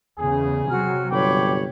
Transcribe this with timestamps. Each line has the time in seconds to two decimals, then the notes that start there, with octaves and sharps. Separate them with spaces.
0.18 E2 C#3 G#4
0.69 C3 F#3 F#4 F6
1.12 G1 C#5 G5 B5 D6